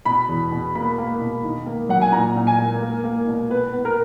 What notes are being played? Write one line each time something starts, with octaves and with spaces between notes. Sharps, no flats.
B2 B5
E2
B2
A#3 B5
A#3
B2
D#3
A#3
F#3 F#5
G#5
A#2 A#5
A#2
G#5
A#3
A#3
A#3
B2
B3 B4
B3
A#4